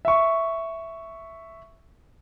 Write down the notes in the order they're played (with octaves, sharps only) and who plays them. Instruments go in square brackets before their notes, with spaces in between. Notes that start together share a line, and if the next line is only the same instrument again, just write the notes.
[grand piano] E5 C#6